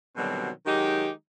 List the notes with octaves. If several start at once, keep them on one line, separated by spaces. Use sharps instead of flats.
B2 D3 D#3 F#3 G3 C4
D#3 F#3 G#3 D#4 G4